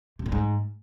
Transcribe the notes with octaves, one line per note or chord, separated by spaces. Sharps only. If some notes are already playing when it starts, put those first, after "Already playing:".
C3
A2
G#2